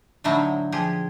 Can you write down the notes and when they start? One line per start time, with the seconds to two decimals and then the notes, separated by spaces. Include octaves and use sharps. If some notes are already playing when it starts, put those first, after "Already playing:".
0.24 A2 D3 F#3 D#4 E4
0.72 F3 G4 G#4